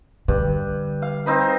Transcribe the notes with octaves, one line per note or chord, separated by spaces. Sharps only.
G2 D3
F5
C4 D#4 B4